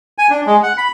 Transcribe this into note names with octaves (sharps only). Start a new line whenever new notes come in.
G#5
D4
G#3
F#5
B5